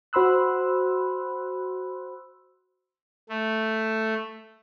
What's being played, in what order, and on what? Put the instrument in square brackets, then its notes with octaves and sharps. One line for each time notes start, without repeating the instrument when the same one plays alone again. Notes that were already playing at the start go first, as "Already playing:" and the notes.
[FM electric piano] F#4 C5 B5 C6 E6 F#6
[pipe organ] A3